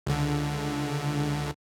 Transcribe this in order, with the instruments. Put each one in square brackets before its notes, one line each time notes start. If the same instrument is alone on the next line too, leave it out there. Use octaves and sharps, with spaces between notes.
[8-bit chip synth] C#2 D3